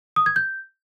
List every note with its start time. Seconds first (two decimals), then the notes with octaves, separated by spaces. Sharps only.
0.16 D#6
0.26 G#6
0.36 G6